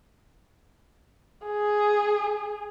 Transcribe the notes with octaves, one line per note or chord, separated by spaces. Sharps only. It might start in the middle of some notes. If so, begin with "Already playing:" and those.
G#4